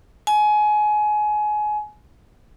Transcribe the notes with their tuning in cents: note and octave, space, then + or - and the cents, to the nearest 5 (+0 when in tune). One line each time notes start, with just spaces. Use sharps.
G#5 +25